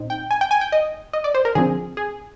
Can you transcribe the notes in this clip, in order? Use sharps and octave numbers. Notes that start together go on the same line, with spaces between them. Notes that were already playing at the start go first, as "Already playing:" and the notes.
Already playing: A#2 C4 D#4
G5
G#5
G5
G#5
G5
D#5
D#5
D5
C5
A#4
D3 F3 C4 G#4
G#4